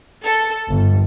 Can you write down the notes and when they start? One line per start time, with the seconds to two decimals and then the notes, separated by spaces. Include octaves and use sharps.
0.24 A4
0.68 G1